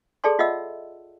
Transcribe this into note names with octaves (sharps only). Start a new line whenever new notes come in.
G#4 A4 D5 A5 C6
F4 D#5 E5 F#5 E6